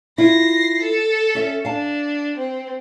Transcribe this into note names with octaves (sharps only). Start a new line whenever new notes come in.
E4 F4 A#6 C7
A4
C#4 E5
D4 F5 A5
C4